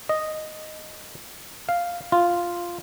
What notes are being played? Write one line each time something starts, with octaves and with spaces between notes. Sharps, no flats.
D#5
F5
F4